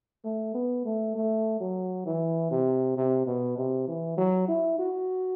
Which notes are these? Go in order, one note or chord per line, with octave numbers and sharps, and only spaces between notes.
A3
B3
A3
A3
F#3
E3
C3
C3
B2
C3
E3
F#3
E4
F#4